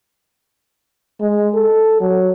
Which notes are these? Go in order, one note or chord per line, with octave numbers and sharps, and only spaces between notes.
G#3
A4
F#3